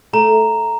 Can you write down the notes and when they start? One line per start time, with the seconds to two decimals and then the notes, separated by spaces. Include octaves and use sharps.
0.13 A3 A#5